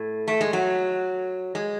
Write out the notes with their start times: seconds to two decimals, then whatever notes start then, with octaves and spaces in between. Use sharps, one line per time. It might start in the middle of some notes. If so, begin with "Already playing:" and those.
Already playing: A2
0.28 A3
0.41 G#3
0.53 F#3
1.55 G#3